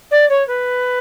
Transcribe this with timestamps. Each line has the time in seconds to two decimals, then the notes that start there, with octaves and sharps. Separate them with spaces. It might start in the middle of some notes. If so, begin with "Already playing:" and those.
0.11 D5
0.29 C#5
0.47 B4